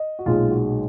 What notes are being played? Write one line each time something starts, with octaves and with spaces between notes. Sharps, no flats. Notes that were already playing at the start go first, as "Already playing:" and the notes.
Already playing: D#5
F#4
B1 A#2 G#3 F4
F#4